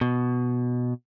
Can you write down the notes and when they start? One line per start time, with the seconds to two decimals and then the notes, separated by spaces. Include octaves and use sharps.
0.01 B2